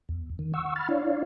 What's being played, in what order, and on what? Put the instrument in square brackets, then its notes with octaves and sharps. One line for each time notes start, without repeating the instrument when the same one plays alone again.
[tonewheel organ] E2
D#3
F#5 C#6 E6
B5 F6 A6
D4 E4 C#5 D5 F5